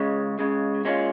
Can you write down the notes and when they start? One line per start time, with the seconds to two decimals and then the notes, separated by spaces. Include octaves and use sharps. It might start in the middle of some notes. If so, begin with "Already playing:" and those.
Already playing: C#2 C#3 G#3
0.39 C#2 C#3 G#3
0.85 A#2 G#3 C#4 F4